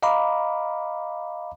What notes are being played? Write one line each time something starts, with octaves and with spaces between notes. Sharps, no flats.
D#5 F5 A#5 B5 D6